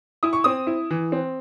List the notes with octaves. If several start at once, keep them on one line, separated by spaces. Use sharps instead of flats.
E4 D#6
C#6
C4 D#6
E4
E3
C4